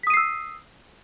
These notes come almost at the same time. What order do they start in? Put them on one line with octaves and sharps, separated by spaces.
B6 D#6 D#7 C7 E6